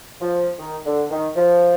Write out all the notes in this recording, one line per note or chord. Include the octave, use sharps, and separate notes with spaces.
F3
D#3
D3
D#3
F3